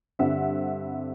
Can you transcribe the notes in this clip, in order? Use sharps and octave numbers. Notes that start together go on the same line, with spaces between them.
G2 D3 G3 C4 E5 F#5